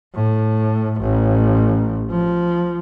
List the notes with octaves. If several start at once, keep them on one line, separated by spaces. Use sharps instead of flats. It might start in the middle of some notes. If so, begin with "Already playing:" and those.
A2
A1
F3